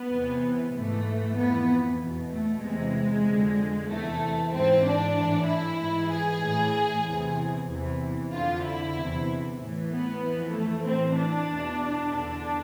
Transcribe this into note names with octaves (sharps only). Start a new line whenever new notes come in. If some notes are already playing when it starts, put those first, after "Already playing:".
Already playing: B3
E2 C3 E3
G#2 E3 A3
F2 E3 B3
E2 B2
A3
E2 C3 E3 G#3
F2 D3
E2 C3 E3 A3
G#2 E3 C4
D4
A2 E3
E4
G#2 E3
G#4
A2 E3
E2 C3 E3
E2 C3 E3
F2 D3 F4
E4
E2 C3 E3
A2 E3
B3
F2 E3
A3
A2 E3 C4
D4
E2 B2
E2 D3 D4